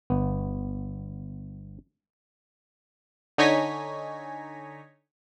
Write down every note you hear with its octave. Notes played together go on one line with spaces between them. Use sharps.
G1 B3
D3 D#4 C#5 G#5 A#6 B6